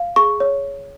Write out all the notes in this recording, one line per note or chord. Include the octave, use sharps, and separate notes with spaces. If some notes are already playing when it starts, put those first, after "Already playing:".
Already playing: F5
G#4 C#6
C#5